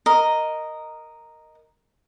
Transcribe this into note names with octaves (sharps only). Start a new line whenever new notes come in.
A#4 D#5